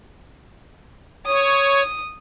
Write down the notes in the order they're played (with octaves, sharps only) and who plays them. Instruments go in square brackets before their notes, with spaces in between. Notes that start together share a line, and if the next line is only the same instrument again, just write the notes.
[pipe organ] C#5 [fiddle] D#6